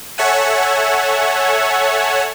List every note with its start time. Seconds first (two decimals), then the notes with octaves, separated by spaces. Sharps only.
0.18 A4 C#5 E5 F#5 G#5